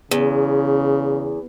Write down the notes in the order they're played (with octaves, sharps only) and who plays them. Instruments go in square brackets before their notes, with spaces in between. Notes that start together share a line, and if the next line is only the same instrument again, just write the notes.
[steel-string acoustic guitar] E2 [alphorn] C#3